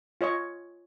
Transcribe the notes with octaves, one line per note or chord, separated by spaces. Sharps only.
F4 C#5 D#5 C#6